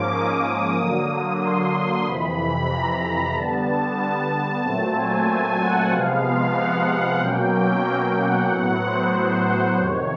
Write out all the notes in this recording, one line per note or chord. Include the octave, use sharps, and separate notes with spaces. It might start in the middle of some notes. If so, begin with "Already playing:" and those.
Already playing: G#2 F3 A#3 C#4 D6
D#6
D3 F#3 A#3
C6
F2 C3 E3 B5
A#5
A#5
D3 G3 B3 A5
A5
A#2 F#3 A3 C4
G#5
F#5
C3 F3 G#3 B3 F5
F#5
B2 F#3 A#3 C#4 G5
F#5
A2 F#3 B3
C5
F2 C3 D#3 C#5